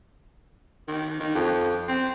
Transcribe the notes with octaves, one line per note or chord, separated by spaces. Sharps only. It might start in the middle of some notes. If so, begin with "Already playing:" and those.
D#3
D#3
F2
C4